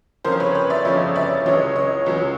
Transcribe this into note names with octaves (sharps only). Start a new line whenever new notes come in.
G1 F2 C#3 F3 A#4 C5
B4 C#5
B4 C#5
D5 E5
G1 F2 C#3 F3 C#5 D#5
D5 E5
C#2 C#3 F#3 C#5 D#5
C#5 D#5
C#2 C#3 F#3